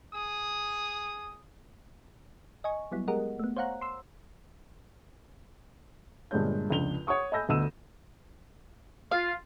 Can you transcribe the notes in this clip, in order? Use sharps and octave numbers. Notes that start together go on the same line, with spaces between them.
G#4 D#6
D#5 G#5 C#6
F#3 G3 B3 E4
G#3 G4 G#4 A#4 D#5 F#5
A3 B3
C5 C#5 F5 F#5 A#5 F#6
C6 E6
G1 G2 A#2 G#3 C#5 G6
F1 C#2 D4 F7 G7
C#5 F#5 C#6 D#6
D#5 G#5 B5 E6 G6 A#6
G1 D2 D#5 E6 D#7 E7
F4 F5